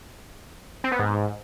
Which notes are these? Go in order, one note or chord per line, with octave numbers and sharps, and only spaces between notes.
C4
B3
G#2